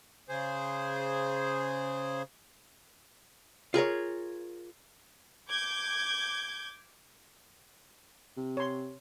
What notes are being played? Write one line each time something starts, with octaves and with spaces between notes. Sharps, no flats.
C#3 G#4 C5
F4 G#4 A#4 C#5
D6 G6 G#6
C3
C#5 C6